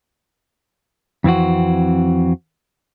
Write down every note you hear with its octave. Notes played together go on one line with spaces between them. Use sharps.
F2 E3 C4 F#4